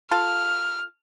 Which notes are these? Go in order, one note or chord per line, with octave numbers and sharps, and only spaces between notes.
F4 A4 F5 F6